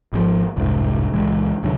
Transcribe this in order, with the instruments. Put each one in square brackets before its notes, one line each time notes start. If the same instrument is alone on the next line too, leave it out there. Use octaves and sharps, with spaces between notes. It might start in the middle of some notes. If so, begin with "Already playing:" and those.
[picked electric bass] G#1 C3 F3
F1 C2 G#2
C#2 A#2 E3 G#3
D2 C3 F#3 D4